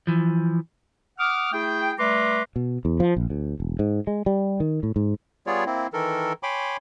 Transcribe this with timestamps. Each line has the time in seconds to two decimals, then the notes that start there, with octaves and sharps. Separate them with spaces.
0.07 E3 F3
1.19 F#5 D6 D#6 F6
1.53 A3 E4 G#4 G5
1.99 G3 A3 B4 A#5 C6 D6
2.56 B2
2.85 E2
3.00 F3
3.17 A#1
3.30 D2
3.60 E1
3.79 G#2
4.07 G#3
4.26 G3
4.60 D#3
4.83 A2
4.96 G#2
5.47 G3 B3 F4 G#4 C#5 D5
5.66 A#3 C4 E4
5.93 D#3 E3 A4 A#4
6.43 C#5 G5 G#5 B5 C6 D6